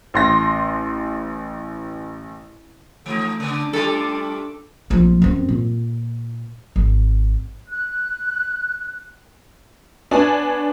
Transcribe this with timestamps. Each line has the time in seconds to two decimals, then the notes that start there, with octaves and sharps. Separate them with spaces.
0.14 A1 C6 A#6
3.06 E3 A3 D#4
3.40 C#3 D4 D6
3.73 G3 A3 F4 A4
4.90 A#1 F3
5.22 F#2 C4
5.49 A#2
6.76 G#1
7.69 F#6
10.11 B3 D4 C#5 G#5